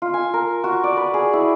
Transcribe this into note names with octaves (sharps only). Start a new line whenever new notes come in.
F4
G#5
A#4
F#4
D5
B4
G#4
E4